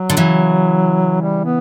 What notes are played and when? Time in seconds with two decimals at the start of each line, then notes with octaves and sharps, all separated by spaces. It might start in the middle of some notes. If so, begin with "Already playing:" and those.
Already playing: F#3
0.10 D3
0.17 C#3 E3
1.22 G3
1.45 B3